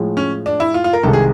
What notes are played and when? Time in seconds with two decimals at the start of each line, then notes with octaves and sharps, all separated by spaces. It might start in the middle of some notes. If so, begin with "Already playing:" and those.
Already playing: A2 F3 G#3
0.17 C#4
0.46 D4
0.60 E4
0.74 F4
0.84 F4
0.93 A#4
1.03 C2 C3 D#3 G#3 A4
1.13 G#4